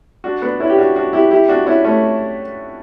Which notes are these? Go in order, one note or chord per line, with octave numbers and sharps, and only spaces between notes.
D4 F#4
B3 D4
C#4 E4
G4
D4 F#4
D4 F#4
E4 G4
E4 G4
D4 F#4
C#4 E4
A3 C#4